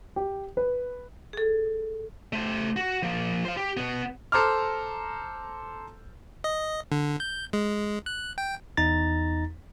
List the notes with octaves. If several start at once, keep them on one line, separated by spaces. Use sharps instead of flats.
G4
B4
G#4 A4
A3 C5
F#4
F3 A#3
C5 F5
G4
B2 B3
A4 C5 A#5 D6 F6
D#5
D3
G6
G#3
F#6
G5
E2 D#4 A#5 A6